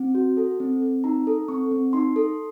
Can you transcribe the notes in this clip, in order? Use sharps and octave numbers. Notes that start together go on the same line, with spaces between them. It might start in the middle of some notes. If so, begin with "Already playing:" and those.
Already playing: C4
F#4
A4
C4
C4
D#4 A#5
A4
C4 C#6
C4
D#4 C6
A4